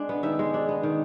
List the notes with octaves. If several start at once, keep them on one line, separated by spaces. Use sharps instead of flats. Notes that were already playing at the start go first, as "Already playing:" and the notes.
Already playing: G#3 D4
B3
D#3 E5
G#3
D4
B3
D#3